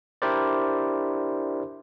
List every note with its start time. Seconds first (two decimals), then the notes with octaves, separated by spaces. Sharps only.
0.22 D4 E4 G4 A#4 C5 D5